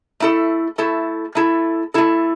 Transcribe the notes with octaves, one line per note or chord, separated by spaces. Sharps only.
A3 E4 A4
A3 E4 A4
A3 E4 A4
A3 E4 A4